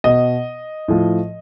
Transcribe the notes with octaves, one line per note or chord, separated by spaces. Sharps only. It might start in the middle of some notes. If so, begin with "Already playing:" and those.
B2 D#5
A2 F3